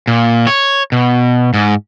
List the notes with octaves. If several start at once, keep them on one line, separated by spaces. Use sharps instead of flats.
A#2
C#5
B2
G#2